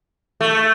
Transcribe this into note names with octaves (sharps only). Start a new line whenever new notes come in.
A3